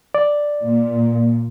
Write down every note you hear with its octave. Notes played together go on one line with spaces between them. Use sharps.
D5
A#2